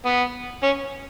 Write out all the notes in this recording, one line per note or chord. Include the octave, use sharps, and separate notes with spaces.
B3
C#4